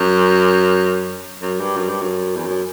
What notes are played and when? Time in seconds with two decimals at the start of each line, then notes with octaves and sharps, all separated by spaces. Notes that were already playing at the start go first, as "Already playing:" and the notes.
Already playing: F#2
1.42 F#2
1.60 G2
1.77 F#2
1.89 G2
2.02 F#2
2.36 E2
2.46 F#2